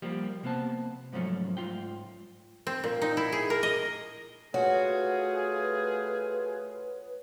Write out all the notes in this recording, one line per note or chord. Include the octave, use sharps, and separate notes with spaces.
F3 G3 A#3 G4
C3 A#3 B3 C5 A5
G#2 F3 F#3 A3 C#4
G#2 F4 G5
C4
A#2
D#4
E4
G#4
A#4
D#5
A3 F4 F#4 G#4 B4 C#5